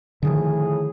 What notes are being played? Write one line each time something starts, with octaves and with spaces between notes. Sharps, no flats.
A2 D3 D#3 F3 G#4